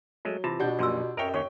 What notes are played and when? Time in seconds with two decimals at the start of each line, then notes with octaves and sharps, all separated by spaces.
0.25 F#3 G#3 A3
0.44 C3 E3 F4 A5
0.60 B2 D4 G4 F#5 G6
0.79 A#1 F#2 A#2 D5 C6 E6
1.17 F#2 A#4 C#5 D#5 E5 G5
1.34 D#2 C#4 C#5 C#6